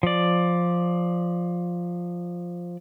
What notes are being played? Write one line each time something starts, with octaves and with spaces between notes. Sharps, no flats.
F3 D5